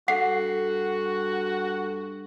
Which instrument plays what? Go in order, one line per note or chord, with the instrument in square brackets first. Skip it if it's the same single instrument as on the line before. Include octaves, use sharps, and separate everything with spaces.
[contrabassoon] G2 [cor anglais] F#4 [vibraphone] A4 [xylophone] F#5 C7